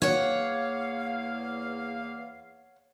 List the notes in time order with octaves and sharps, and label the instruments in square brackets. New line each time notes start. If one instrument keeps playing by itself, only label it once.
[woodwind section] E2 A#3 F5 [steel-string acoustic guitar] C#5 F#5